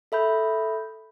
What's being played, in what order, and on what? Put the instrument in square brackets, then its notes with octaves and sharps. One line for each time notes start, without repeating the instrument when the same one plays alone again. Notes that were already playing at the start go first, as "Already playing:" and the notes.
[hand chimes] A4 E5 B5 G6